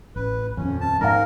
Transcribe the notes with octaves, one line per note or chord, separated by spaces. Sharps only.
A1 B4
D#1 F2 C#4
A5
G#2 A#4 F5 G#5 A#5